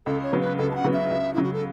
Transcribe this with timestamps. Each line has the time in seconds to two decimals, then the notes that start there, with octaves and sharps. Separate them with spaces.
0.06 C#2 A4
0.23 C#5
0.32 C#3 F#3 B3
0.41 B4
0.58 C#2 A4
0.71 A5
0.75 F#5
0.84 C#3 F#3 B3
0.93 E5
1.11 C#2
1.34 C#3 F#3 E4
1.43 F#4
1.53 A4